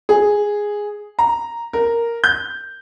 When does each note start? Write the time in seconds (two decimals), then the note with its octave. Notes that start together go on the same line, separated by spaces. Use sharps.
0.09 G#4
1.19 A#5
1.73 A#4
2.24 G6